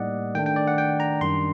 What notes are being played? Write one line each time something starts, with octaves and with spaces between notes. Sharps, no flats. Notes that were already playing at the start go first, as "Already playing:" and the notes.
Already playing: A2 G3 A#3 D#4 D5 D#5 F#5
D#3 A3 D4 G5
G5
D5
F#5
G5
A#5
F#2 D#3 G3 D4 C6